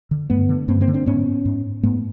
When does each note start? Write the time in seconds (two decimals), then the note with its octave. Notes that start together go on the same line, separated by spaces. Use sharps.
0.11 D3
0.30 G2 A3 B3
0.49 D3
0.68 G2 A#3 C4
0.81 A#3 C4
0.88 D3
0.94 C4 D4
1.06 G#2 B3 C#4
1.45 G#2
1.83 G#2 A3 B3